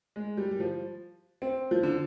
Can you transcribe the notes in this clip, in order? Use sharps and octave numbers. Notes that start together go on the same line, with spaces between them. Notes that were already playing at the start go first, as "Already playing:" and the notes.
G#3
G3
G3
F3
C4
F3
D3